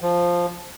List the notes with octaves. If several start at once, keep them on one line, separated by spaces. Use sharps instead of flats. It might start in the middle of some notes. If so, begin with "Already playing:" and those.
F3